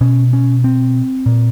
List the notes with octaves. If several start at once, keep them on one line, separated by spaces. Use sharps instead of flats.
B2 C#4
C#4
C4
A#2